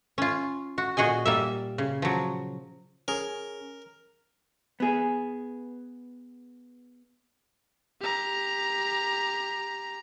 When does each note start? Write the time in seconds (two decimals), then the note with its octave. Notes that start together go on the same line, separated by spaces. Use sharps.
0.18 C#4 F4
0.78 F#4
0.97 A#2 F#4 G#4 D#5 G#5
1.26 G3 A#3 E5
1.78 C#3
2.02 F3 F#3
3.08 C#4 G#4 A#4
4.80 B3 G#4
8.01 G4 A#5